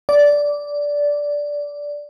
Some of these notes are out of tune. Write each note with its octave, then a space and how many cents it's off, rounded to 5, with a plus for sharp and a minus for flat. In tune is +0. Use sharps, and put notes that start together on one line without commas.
D5 -10